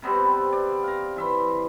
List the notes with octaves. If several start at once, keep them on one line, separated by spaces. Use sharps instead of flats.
C3 G3 B3 C4
D5
F5 A#5
E3 E5 C6